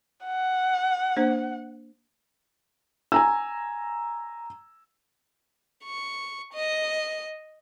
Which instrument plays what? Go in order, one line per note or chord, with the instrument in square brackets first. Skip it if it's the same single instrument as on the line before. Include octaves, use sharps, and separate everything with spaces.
[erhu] F#5
[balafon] A#3 D4 C5
[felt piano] G#5 A#5 E6
[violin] C#6
D#5